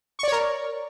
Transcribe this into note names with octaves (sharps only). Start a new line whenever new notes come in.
A#4 C#5 D5 C#6